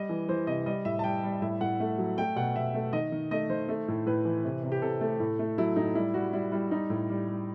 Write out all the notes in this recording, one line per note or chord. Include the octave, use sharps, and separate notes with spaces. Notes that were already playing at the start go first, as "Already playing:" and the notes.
Already playing: G3 D#5
E3
E3 C5
C3 D#5
G3 D#5
A2 E5
A5
G3 G5
G3
A2 E5
A2 F#5
A3
F#3
A3 G5
B2 F#5
B2 E5
A3
D#3 D#5
D#3
A3 D#5
D#3 C5
A3
A2
A2 B4
E3
C3
C3
G4
C3 A4
A3
A2
A3
F#3 E4
A2 D#4
G3 E4
G3 F#4
G3 E4
G3 E4
G3 D#4
A2
G3
G3